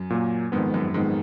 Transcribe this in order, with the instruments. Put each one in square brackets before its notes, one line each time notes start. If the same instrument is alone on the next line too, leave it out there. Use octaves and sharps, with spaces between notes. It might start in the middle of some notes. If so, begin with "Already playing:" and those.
Already playing: [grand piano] F#2
[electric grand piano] A#2 F#3 A#3
[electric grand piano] F2 D#3 G#3 B3 [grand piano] G#2
[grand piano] F#2
[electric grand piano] F2 D#3 G#3 B3 [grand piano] G#2